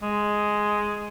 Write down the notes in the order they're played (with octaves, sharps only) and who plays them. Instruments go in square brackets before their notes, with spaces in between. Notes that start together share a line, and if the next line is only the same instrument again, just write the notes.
[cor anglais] G#3